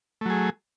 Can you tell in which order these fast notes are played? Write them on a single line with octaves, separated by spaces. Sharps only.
A3 F#3 G#4